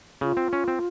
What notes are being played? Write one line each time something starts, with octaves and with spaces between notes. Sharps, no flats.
C#3 F4
C4
C#4
C4